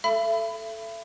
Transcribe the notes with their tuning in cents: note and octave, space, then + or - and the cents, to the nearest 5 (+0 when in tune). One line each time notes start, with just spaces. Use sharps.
A4 +0 E5 +35 B5 +25